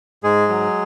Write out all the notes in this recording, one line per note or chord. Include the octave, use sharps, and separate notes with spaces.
G#2 G#3 G#4
F#3